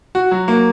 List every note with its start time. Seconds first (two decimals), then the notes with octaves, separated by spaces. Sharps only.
0.15 F#4
0.31 F#3
0.48 A#3